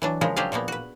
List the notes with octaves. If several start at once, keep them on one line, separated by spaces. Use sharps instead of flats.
E3 F#3 D4
C#3 F3 G#3 A#4
F#3 C4 D4 G4 G#4 F5
A#2 F3 A#3 B3
F#4 B4